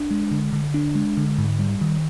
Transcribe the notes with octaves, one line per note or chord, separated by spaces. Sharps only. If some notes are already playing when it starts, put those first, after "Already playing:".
Already playing: D4
G#3
D3
D3
D4
G#3
D3
G#2
G3
D#3